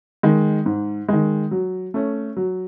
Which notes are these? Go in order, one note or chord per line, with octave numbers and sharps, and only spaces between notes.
D#3 G#3
G#2
D#3 G#3
F#3
A3 C#4
F#3